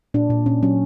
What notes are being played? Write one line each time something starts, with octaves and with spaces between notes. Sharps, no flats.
A#2 D4
A#2
A#2 C#4
F#3 C#4